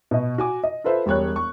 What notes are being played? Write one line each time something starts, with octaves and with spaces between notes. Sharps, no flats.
B2 D#5
F#4 G#5 D6
D#5
F4 A4 B4 C5 E5
E1 G3 C#5 F#6
C#6